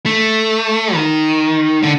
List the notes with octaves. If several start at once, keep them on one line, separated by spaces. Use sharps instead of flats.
A3
D#3
D3